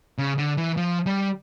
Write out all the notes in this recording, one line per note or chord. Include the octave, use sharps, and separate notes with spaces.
C#3
D3
E3
F3
G3